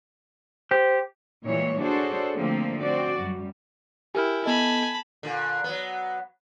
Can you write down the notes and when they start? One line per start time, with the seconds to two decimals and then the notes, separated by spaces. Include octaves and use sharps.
0.71 G4 C5
1.44 A#2 E3 G3 G#3 C#5
1.82 D4 F#4 G#4 A4 C5 C#5
2.36 D3 F3 A3 A#3 C4
2.83 C4 F#4 D5
3.20 F#2 G3
4.15 E4 G4 A#4 G5 G#5 F6
4.45 B3 A4 D#5 G#5 A5 B5
5.23 A#2 D3
5.64 F#3 B3